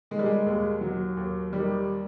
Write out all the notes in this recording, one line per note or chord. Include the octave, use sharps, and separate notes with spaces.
D#3 G#3
G3
G#3
D#2
F#3
D#2
D#3 G3